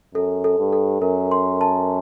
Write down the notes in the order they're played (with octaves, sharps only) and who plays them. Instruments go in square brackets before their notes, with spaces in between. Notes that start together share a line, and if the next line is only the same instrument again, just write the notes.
[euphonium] F#2 [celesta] A4
[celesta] A4
[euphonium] G2
[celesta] A4
[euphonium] F#2 [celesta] A#4
[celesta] C6
A5